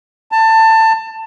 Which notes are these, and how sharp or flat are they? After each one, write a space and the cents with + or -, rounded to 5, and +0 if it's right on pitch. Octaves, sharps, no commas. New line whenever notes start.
A5 +20